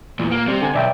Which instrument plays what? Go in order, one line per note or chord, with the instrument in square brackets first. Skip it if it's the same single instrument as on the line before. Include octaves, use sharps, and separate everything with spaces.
[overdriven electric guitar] E2 [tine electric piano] A#2
[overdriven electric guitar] A#3
[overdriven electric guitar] C3 [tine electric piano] G3
[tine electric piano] D3 G#5 G#6
[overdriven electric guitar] B1 [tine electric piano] D5 E5 G5